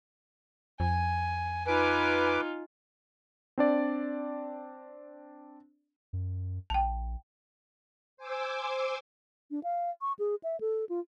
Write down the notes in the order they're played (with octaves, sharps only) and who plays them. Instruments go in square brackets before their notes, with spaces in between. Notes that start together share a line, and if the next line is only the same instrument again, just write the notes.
[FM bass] F2 [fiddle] G#5
[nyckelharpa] D#4 F4 [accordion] B4 D6 [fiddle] G#5
[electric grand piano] C4 D4 D5
[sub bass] F#2
[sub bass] A#1 [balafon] G5 A5
[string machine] C5 G#5 D6 E6
[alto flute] D4
F5
C#6
G#4
E5
A4
F4